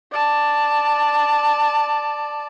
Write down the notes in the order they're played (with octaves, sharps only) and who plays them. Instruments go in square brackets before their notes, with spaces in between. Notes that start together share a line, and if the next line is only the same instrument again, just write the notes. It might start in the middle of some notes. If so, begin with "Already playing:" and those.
[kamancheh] D5 A5